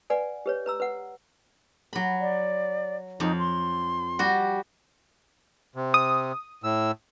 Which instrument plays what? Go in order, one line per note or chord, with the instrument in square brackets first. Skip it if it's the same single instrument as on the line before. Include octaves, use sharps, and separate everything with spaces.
[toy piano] B4 D5 F#5 G#5
G4 B4 C#5
B4 A#5 E6
B4 F#5
[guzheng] F#3 B5
[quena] D5
[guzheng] F2 [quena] D#4
[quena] C6
[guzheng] G3 F#4
[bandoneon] C3
[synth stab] D#6
[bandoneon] A2 E6